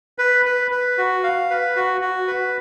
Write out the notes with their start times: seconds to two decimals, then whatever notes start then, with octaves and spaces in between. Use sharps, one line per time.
0.19 B4
0.46 B4
0.71 B4
0.98 F#4
1.23 F5
1.50 B4
1.76 F#4
2.01 F#4
2.27 B4